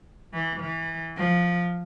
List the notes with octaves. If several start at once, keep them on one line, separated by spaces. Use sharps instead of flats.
E3
E3
F3